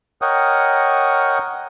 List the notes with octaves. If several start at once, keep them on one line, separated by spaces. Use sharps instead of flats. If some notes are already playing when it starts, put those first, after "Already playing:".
A#4 C#5 D#5 F#5 G5 D#6